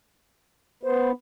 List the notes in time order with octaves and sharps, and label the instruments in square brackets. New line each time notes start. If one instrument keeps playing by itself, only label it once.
[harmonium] B3 [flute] C5